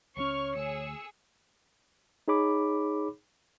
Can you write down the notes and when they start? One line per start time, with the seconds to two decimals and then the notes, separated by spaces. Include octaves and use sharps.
0.17 C#2 G3 C#4 C#5 C#6 F6
0.55 D2 G#4 E6 C#7
2.28 D#4 G#4 C#5 B5 D6